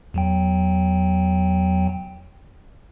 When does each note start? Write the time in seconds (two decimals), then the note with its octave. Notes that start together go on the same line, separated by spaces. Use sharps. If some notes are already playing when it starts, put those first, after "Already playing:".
0.14 E2 F#3 G5